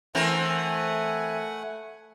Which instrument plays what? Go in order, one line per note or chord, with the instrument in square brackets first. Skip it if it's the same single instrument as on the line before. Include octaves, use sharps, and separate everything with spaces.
[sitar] E3 C4 A#4 [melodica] A3 F#5 G#5